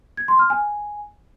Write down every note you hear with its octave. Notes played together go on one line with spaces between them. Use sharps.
G#6
C6
F6
G#5